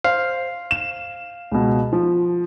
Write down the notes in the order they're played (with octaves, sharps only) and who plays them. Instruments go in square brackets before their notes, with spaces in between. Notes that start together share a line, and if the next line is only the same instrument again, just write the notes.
[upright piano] C5 [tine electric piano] F5
[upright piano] E7
C#2 B2
F3